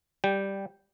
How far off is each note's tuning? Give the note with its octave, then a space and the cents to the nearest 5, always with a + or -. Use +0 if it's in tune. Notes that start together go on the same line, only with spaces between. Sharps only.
G3 +0 G5 +0